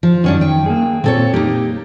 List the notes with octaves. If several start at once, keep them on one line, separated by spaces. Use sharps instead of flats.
F3
F#2 D#3 C#4 D4
G5
A#3 G#4
A#2 C4 A4 C#5
A#3 D#4 G4